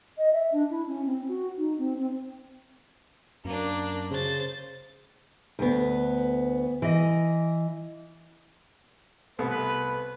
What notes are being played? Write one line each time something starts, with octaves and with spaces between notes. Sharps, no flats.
D#5
E5
D4
E4
C#4
C4
F#4
D#4
C4
C4
F#2 A#3 D4
C#3 C5 A6
D2 B3
E3 D#5
C2 A3 B3 B4